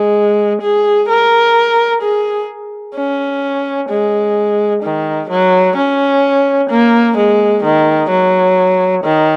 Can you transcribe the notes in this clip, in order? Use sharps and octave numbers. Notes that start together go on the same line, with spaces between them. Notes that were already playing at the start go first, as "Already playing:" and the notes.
Already playing: G#3
G#4
A#4
G#4
C#4
G#3
D#3
F#3
C#4
A#3
G#3
D#3
F#3
D#3